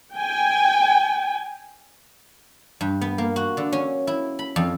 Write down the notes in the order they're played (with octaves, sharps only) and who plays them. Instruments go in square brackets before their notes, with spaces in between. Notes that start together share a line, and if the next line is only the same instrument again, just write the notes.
[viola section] G5 G#5
[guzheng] G2
B3
A#3
F#4
D3
C#4
E4
B5
F2